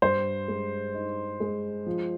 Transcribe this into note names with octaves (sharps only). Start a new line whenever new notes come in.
G2 C5
G#3
D#4
G#3
F3